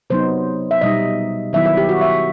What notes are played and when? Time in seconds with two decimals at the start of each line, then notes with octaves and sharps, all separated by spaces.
0.10 C3 F#3 B3 D#4 C5
0.71 E5
0.81 B2 G3 D#4 D#5
1.53 D#3 F#3 B3 E4 E5
1.66 E5
1.77 G4
1.89 F#4
2.01 E5